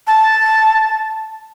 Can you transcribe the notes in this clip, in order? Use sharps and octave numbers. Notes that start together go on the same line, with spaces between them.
A5